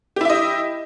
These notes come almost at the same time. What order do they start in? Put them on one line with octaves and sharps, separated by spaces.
G4 E4 E5 D#5